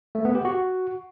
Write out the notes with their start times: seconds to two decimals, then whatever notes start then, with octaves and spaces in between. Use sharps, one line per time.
0.15 A3
0.25 B3
0.35 G4
0.45 F#4